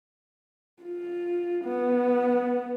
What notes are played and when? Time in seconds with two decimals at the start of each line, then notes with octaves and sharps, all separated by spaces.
0.83 F4
1.65 B3